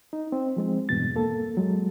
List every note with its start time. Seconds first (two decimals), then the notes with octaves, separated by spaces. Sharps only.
0.13 D#4
0.32 C4
0.56 F3 G#3 C4
0.89 E2 G2 B2 A6
1.16 A#3 A4
1.57 F#3 G#3